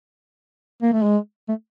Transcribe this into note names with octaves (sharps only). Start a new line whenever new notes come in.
A#3
A3
G#3
A3